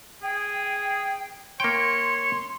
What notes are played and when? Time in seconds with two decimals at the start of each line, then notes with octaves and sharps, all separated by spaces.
0.23 G#4 G5
1.60 A#3 C#5 G5 C6